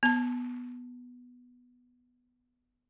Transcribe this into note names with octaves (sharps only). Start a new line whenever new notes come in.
B3 A5